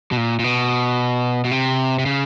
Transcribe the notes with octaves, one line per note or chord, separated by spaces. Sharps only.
B2
A#2
A#2
B2
B2
C3
C3
C#3